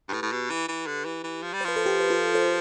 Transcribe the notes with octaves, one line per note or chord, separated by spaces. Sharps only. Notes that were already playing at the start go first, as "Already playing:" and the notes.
G2
A2 G4 B4
A2
B2
E3
E3
D3
E3
E3
F3
G3
C5
F3 B4
A4 C5
G4 B4
B4
F4 A4
A4 C5